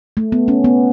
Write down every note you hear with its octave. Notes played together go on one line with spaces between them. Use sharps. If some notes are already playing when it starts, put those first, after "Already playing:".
A3
B3
C#4
B3